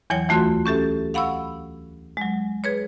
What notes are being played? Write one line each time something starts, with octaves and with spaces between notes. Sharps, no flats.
E2 E3 F#3 C#5 G5
D2 E3 A3 F4 F#4 C6
C#4 G4 A4 E5
F5 F#5 B5 C#6 E6
F#3 G#3
G#4 B4 C#5